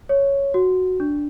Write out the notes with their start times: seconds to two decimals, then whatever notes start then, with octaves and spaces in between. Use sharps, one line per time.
0.09 C#5
0.54 F#4
1.00 D4